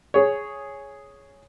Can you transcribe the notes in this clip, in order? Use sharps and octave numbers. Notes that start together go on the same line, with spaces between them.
G#4 C#5